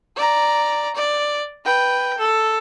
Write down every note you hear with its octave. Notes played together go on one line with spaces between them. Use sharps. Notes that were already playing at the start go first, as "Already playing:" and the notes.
D5 A#5
D5
B4 G5
A4